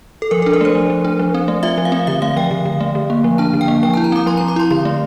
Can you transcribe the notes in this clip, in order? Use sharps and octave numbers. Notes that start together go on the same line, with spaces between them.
A4
F3 A#4
A4
D4
A#4
A3 C5
F3
F3
D4
F3
C4
A3
F4 E5
F3
F5
C4
D3 E5
A3 F5
F3 G5
D3
D3
A3
D3
A#3
F3
D4 A5
D3
G5
A#3
F3 G5
A5
E4
A#5
C4 D6
F3 C6
A#5
F3
D6
E4 C6
D3 C6
A3